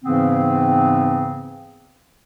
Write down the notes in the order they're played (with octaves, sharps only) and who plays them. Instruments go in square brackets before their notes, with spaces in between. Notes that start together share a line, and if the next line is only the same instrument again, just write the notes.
[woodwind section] G#2 C#3 E3 B3 C4